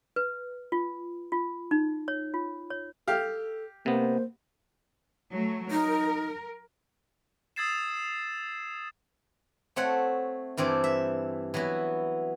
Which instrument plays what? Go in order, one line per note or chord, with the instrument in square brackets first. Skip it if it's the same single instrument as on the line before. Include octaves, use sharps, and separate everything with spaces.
[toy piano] B4
F4
F4
D#4
C#5
F4
C#5
[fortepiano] G4 F5 [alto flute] A4
[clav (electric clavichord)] C3 B3 [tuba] A#3 [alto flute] C5
[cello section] F#3 A3
[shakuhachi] D#4 [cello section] A#4
[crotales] D#6 E6 G#6 A6 C7 E7
[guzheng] A3 C4 C#5 F#5
G2 E3 C4 D5
E5
E3 F#3 B3 F#4